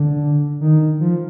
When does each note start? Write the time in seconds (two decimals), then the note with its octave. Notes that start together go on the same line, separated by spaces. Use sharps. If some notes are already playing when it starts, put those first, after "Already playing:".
Already playing: D3
0.60 D#3
1.00 F3